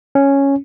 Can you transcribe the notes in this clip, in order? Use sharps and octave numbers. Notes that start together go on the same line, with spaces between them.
C#4